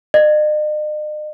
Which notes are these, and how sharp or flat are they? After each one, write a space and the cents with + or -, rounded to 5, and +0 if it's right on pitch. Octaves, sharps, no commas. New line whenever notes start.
D#5 -45